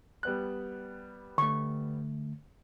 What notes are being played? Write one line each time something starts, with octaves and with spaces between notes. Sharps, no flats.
G3 B3 F#6
D3 A3 C#6